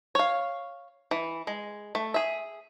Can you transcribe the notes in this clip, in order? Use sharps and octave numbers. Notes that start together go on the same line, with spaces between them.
C#5 F5
E3
G#3
A3
G#4 E5